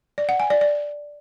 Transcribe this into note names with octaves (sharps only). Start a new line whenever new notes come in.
D5
F#5
G#5
D5
D5